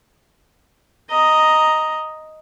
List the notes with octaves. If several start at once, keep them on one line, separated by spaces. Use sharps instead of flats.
D#5 A#5